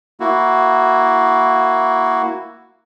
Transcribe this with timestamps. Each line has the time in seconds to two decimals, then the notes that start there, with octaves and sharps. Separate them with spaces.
0.20 A#3 E4 F#4